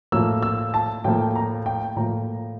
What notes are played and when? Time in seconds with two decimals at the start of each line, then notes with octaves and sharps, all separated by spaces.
0.12 A2 F3 A#3 E6
0.43 E6
0.74 A5
1.04 A2 F3 A#3 G5
1.35 A#5
1.66 G5
1.96 A2 F3 A#3 A#5